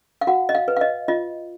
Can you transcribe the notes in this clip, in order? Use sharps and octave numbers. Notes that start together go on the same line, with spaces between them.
F5
F#4 F#5
D#5
F5
B4
F5
D#5
F4 D#5